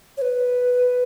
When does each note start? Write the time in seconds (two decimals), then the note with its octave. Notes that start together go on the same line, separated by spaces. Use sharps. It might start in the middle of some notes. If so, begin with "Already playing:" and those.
0.17 C#5
0.22 B4